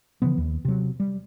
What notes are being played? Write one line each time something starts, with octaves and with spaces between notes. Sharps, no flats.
C#3 E3 F3 B3
D#2
C3 F#3
G3